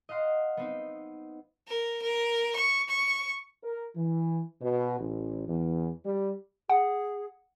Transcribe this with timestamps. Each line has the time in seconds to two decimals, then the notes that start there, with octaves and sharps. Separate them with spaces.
0.09 D#5 F5 F#5 C6
0.57 B3 C4 D#4
1.68 A#4
2.02 A#4
2.56 C#6
2.88 C#6
3.63 A#4
3.96 E3
4.62 B2
4.99 A1
5.47 E2
6.05 G3
6.69 G#4 F#5